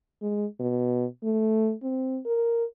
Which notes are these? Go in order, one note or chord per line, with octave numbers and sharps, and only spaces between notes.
G#3
B2
A3
C4
A#4